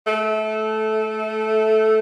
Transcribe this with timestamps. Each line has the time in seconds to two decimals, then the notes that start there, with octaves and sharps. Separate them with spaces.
0.07 A3